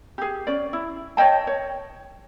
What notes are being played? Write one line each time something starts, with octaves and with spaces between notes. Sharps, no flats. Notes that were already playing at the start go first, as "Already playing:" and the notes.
G4 G#4
C#4 D5
E4
C#5 D#5 G5 A5
C#5